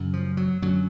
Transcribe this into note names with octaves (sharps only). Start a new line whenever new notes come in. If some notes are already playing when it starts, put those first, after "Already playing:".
Already playing: F#2 C#3
F3
F#3
F#2 D3 F#3